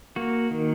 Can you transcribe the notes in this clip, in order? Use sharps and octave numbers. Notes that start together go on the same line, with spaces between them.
A#3 F#4
D#3